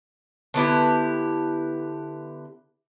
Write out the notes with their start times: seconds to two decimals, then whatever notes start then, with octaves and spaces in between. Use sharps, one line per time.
0.54 D3 B3 E4 G4